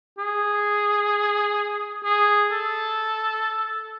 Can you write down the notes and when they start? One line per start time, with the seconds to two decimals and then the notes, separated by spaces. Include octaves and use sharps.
0.18 G#4
2.04 G#4
2.52 A4